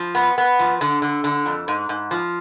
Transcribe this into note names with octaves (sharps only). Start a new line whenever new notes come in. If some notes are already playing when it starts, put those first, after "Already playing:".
Already playing: F3
B3
B3
F3
D3
D3
D3
F2
G#2
G#2
F3